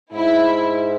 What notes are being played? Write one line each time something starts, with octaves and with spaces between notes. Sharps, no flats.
G#2 E4